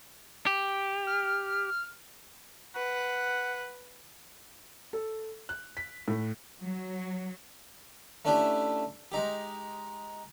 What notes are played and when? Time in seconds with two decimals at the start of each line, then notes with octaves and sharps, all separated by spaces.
0.46 G4
1.07 F6
2.75 B4 F#5
4.93 A4
5.49 F#6
5.77 B6
6.08 A2
6.63 F#3
8.25 A3 C#4 D4 E4 G4
9.12 G#3 D#4 G4